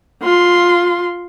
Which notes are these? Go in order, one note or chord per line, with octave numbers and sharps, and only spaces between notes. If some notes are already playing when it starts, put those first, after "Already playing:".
F4 C6